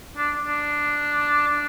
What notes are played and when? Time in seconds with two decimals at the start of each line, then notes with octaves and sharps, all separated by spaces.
0.17 D4
0.45 D4
1.48 D4